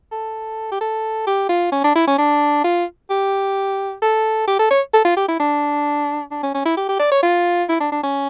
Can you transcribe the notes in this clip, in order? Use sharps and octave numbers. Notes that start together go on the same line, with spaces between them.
A4
G4
A4
G4
F4
C#4
D4
E4
C#4
D4
F4
G4
A4
G4
A4
C#5
A4
F4
G4
E4
D4
D4
C#4
C#4
E4
G4
G4
D5
C#5
F4
E4
D4
D4
C#4